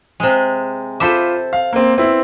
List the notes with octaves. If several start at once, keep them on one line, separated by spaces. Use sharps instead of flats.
C3 G#3
F4 A4 C5 E5 B5 D6
F5
A#3 C4
B3 C4 E4